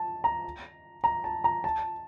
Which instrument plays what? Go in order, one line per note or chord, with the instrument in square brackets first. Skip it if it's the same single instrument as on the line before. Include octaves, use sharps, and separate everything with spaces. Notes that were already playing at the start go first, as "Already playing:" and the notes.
Already playing: [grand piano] A5
A#5
A#5
A5
A#5
A5